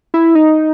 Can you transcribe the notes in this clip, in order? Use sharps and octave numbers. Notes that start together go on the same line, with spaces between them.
E4
D#4